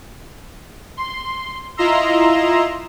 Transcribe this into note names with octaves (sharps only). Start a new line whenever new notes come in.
C6
E4 F4 D#5 A#5 C6 E6